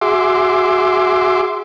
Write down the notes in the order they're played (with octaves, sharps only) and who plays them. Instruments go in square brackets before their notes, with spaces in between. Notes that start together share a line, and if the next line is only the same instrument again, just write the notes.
[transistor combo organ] F#4 G#4 E5 C6 D6